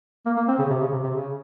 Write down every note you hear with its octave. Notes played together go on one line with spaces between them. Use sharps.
A#3
A#3
C4
C#3
C3
C#3
C3
C3
C#3